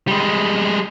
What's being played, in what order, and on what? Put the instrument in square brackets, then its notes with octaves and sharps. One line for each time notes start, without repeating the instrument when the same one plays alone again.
[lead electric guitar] G3 G#3